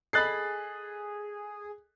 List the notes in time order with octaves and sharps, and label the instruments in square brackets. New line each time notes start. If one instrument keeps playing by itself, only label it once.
[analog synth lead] G#4 [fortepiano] A4 D#5 B5 [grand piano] F#6 A6 C7